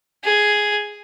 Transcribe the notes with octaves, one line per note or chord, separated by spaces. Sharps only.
G#4